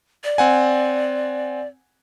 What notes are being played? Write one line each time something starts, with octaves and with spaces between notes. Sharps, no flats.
D5
C4 F#5 G#5